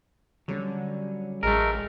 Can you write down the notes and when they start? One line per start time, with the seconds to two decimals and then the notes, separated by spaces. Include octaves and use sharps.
0.48 D3 F#3 G3 C#4
1.43 A1 G#3 A3 A#4